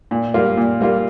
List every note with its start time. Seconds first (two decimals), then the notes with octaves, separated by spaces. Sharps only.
0.11 A#2
0.34 G3 A#3 F4
0.57 A#2
0.81 G3 A#3 F4